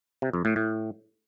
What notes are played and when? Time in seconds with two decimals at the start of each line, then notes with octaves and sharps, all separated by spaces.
0.22 C3
0.33 F2
0.45 A2
0.56 A2